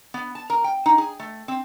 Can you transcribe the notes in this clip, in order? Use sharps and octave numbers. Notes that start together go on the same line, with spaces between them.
B3
A5
A#4
G5
D#4
G#4
A3
C4